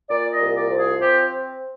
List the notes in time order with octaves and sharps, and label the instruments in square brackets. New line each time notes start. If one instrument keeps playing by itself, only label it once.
[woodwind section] A#2 D5
D#5
C2
D5
F3
G#4
C4 G4